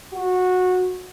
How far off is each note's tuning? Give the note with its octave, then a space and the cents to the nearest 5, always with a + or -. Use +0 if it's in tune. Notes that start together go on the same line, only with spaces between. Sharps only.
F#4 -15